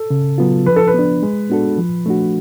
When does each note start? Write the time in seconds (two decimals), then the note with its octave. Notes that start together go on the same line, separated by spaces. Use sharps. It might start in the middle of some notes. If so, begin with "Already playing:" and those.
Already playing: A4
0.10 C#3
0.38 F#3 B3 F4
0.66 F3 B4
0.76 A4
0.88 B4
0.94 B3 D4
1.23 G#3
1.50 B3 D4 F#4 A4
1.78 F3
2.06 A3 D4 F#4